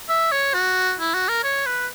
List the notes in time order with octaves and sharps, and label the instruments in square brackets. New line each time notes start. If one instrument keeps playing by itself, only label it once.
[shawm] E5
C#5
F#4
E4
F#4
A#4
C#5
B4